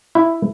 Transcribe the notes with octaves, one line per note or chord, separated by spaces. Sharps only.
E4